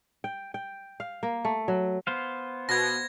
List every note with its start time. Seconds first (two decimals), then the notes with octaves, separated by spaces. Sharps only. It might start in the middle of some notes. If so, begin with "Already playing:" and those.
0.24 G5
0.54 G5
1.00 F5
1.23 A#3
1.45 A3
1.68 F#3
2.07 B3 C5 F5
2.69 B2 G#6 A#6